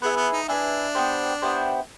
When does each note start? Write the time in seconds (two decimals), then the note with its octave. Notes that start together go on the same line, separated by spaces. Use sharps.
0.02 B3 E4 G#4 B4
0.17 B3
0.33 D#4
0.48 D4 E4 G#4 B4
0.95 B3 E4 G4 C5
1.42 B3 E4 G4 C5